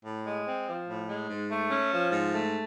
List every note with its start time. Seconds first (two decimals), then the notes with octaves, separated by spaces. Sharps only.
0.04 A2
0.25 G#3
0.46 C4
0.67 F3
0.88 A2
1.09 G#3
1.29 G#2
1.50 A3
1.71 C#4
1.92 F3
2.12 G#2
2.33 A3